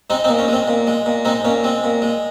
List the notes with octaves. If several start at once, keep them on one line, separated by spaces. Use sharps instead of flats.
G#3 C4 D#4
C4 D#4
A#2
C#4
G#3 C4
A#2
G#3
A#2
G#3 C4 D#4
A#2 C#4
G#3 C4
A#2
G#3